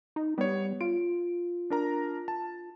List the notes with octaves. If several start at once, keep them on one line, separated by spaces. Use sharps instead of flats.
D#4
G3 B3 C#5
F4 D7
D4 A#4 A#5
A5